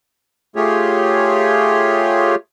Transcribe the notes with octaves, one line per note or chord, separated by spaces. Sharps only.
A3 F4 G4 G#4 C#5